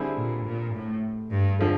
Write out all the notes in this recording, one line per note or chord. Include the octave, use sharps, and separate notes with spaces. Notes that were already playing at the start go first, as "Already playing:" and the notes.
Already playing: D3 G3 C4 E4 G#4
A#2
A#2
A2
G2
D3 F3 G#3